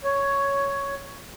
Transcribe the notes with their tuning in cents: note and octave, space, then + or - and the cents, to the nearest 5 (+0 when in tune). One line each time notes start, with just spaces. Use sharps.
C#5 +5